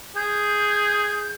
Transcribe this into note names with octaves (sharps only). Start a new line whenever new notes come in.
G#4 G6